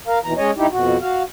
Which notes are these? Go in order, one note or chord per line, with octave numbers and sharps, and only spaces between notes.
A#4 F5
D#2 B2 E3 A#5
G#3 C#4 C#5 D#5
G2 D#4 E4 G4
F2 B2 F#4
F#4 F5